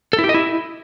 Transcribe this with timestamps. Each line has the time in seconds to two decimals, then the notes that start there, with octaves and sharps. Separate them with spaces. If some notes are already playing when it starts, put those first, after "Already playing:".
0.13 A4
0.19 E4
0.24 G4
0.29 D#5
0.34 E4